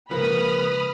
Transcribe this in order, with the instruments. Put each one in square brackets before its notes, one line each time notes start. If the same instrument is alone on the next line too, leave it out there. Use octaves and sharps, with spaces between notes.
[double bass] C#3 G#3 [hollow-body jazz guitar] F3 A#3 [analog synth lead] B4 [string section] B5 D#6 F6